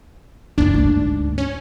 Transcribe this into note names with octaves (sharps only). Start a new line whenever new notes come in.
F#1 E2 D4
D2 G#2
C#4